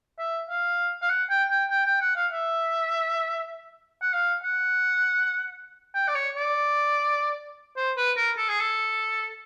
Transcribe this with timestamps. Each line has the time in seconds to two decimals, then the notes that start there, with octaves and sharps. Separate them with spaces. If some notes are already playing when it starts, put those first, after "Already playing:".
0.19 E5
0.49 F5
1.02 F5
1.10 F#5
1.30 G5
1.50 G5
1.71 G5
1.86 G5
2.01 F#5
2.16 F5
2.32 E5
4.02 F#5
4.13 F5
4.43 F#5
5.95 G5
6.08 D5
6.15 C#5
6.35 D5
7.77 C5
7.97 B4
8.17 A#4
8.37 A4
8.49 G#4
8.60 A4